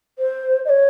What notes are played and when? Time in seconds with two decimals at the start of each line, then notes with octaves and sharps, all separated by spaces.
0.19 C5
0.65 D#5
0.69 C#5